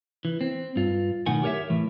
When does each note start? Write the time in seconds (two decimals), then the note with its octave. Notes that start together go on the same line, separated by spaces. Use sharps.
0.25 E3
0.41 C4
0.77 G2 F4
1.26 B1 A2 D#3 F#5 G#5
1.43 G4 A#4 C#5 D#5 E5
1.70 A2 E3